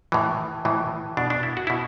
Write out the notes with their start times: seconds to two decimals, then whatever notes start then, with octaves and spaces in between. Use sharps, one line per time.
0.12 A2 E3
0.65 A2 E3
1.17 B2 D4
1.30 D4
1.43 E4
1.57 F#4
1.67 B2 E4